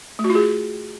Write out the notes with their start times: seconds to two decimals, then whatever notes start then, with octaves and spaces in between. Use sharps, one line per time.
0.19 A3
0.24 F#4
0.30 F4
0.35 G#4